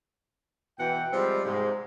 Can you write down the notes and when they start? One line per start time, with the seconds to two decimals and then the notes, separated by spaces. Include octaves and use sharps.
0.79 B2 E3 E4 F#5 G5
1.13 F3 G3 G#3 C4 F4 G4
1.46 G#2 C3 G#3